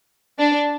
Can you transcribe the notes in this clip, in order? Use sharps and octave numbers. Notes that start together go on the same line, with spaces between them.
D4